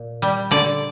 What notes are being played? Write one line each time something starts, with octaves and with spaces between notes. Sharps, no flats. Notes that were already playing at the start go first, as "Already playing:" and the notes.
Already playing: A#2
G3
D3 D5